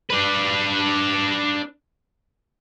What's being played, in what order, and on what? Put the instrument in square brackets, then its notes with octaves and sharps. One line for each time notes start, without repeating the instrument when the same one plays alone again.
[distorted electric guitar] D4 B4